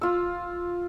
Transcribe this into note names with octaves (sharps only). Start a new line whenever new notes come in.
F4 E6